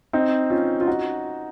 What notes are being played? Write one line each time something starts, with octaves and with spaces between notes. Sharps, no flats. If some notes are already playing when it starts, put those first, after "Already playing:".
C4 D#4
C#4 F4
F4
D#4 F#4